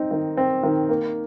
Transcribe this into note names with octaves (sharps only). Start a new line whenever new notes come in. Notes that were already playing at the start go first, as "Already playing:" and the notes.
Already playing: C4 D#4
D#3
C4
D#3
A#3